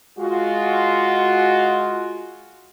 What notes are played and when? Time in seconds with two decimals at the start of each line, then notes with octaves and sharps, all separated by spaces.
0.19 G#3 F4 F#4